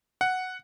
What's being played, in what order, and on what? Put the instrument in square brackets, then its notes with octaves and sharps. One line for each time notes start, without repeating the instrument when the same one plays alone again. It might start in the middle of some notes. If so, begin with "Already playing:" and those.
[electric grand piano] F#5